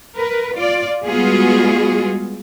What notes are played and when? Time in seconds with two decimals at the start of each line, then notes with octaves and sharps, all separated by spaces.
0.15 A#4 B4
0.54 F4 D5
1.06 G3 G#3 B3 F4 F#4 G#4